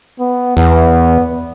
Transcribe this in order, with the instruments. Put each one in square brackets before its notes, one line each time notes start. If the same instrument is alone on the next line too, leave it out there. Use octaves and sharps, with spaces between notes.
[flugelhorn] B3
[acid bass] E2 [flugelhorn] B3